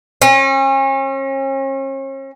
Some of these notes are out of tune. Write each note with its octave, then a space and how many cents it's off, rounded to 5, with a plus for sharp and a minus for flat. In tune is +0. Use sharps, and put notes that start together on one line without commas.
C#4 -40